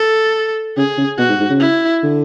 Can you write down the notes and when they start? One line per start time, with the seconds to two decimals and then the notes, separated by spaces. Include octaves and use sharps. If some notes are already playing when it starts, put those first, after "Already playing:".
Already playing: A4
0.77 C#3 G#4
0.98 C#3
1.19 B2 F#4
1.29 G#2
1.40 G#2
1.50 C#3
1.60 E4
2.03 D3